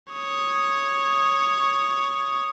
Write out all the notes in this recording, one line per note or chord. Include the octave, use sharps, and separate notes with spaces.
C#5 D#6